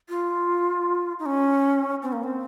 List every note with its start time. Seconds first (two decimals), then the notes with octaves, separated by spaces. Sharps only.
0.09 F4
1.19 D#4
1.26 C#4
2.03 C4
2.13 A#3
2.24 C4